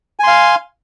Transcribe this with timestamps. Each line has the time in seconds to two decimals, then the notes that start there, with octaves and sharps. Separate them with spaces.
0.19 G#5
0.23 C6
0.27 F5